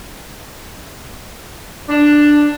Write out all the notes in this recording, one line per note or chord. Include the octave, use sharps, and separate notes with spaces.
D4